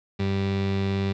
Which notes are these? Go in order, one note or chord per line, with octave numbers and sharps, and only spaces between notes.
G2